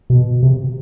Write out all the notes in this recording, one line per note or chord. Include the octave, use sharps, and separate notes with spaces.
B2
C3